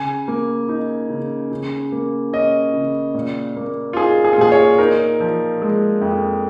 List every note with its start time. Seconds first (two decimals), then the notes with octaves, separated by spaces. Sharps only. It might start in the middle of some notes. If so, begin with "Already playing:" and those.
Already playing: C#3 G#5
0.28 A#3
0.69 D#4
1.10 C#3
1.51 C#3
1.92 A#3
2.33 C#4 D#5
2.73 C#3
3.15 A#2
3.57 A#3
3.93 F4
3.96 D#4 G#4
4.24 G#4
4.33 F4
4.38 A#2 G#4
4.52 C#5
4.78 D#4 A#4
5.20 F3
5.62 G#3
6.01 F2